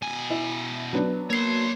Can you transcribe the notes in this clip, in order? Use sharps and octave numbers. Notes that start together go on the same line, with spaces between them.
B2 G#5
E4
F#3 B3 D4
A#3 C#5 C6 C7